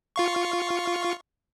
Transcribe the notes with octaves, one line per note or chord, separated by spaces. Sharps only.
F4 F5 C#6